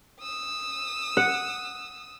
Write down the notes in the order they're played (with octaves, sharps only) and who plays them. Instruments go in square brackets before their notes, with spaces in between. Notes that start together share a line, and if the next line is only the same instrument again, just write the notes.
[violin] D#6 E6
[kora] F#5